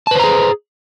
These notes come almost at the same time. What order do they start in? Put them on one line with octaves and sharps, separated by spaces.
A5 B4 C5 A#5 G#4